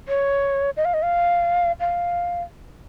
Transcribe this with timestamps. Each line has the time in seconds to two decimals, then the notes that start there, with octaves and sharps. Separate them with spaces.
0.09 C#5
0.77 D#5
0.85 F5
0.94 D#5
1.02 F5
1.80 F5